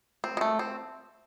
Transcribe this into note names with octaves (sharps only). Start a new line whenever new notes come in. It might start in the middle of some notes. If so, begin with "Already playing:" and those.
C4
G#3
A3
C4